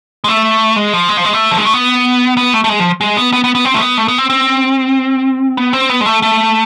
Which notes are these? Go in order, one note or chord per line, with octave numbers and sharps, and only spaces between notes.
G#3
A3
G#3
F3
G#3
F3
G#3
A3
F3
G#3
A3
B3
B3
A3
A3
G#3
F3
G#3
B3
B3
B3
B3
C4
A3
B3
A3
B3
C4
C4
B3
C4
B3
G#3
A3
A3